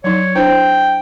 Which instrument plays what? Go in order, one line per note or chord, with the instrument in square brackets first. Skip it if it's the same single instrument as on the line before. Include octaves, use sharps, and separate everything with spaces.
[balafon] F#3 D#4 [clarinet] C#5
[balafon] D4 E4 C5 [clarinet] G5